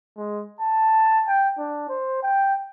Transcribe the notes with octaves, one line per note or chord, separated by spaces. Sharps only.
G#3
A5
G5
D4
C5
G5